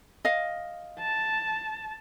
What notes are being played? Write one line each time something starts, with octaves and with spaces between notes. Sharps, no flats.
D#5 F5
A5